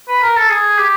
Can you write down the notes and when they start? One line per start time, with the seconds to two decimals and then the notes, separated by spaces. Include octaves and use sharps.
0.08 B4
0.22 A#4
0.36 A4
0.50 G#4
0.78 G4